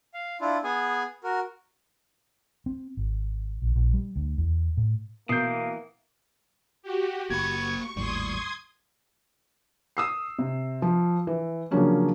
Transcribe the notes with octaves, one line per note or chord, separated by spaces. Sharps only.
F5
D4 E4 F4
B3 G#4 G#5
F#4 A#4
C4
G#1
A#1
A#1
G3
D2
E2
A2
B2 E3 A#3 D#6 G6 C7 D7
F#4 G4
F#1 A#3 B5 C#6 G#6
G#1 D#2 A2 G3 C6 C#6 D#6 G#6
D#6 E6 C7
C3
F3
E3
C#3 F3 F#3 A#3 C#4 D4